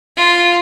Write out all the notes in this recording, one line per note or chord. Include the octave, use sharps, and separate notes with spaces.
F4